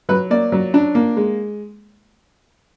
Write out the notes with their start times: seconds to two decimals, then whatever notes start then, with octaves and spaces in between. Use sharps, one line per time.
0.09 F#3 B4
0.30 A#3 D5
0.52 F#3
0.74 D4
0.95 A#3
1.17 G#3